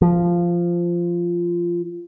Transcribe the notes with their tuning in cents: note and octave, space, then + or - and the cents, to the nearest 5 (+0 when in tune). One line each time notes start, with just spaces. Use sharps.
F3 -10